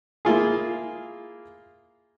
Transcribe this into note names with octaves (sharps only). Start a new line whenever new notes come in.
A#3 E4 F4 G#4